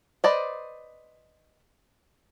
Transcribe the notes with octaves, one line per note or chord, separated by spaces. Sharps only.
B4 C5 D5 D#5